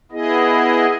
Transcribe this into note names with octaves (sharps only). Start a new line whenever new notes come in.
B3 E4 G#4 D#5